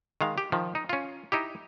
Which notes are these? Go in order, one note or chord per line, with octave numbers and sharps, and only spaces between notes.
D#3 G#3 F5
G4
D#3 F3
D#4
C#4 F4
D#4 E4 G4